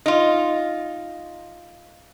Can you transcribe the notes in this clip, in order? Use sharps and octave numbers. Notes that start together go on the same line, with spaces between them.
D#4 F4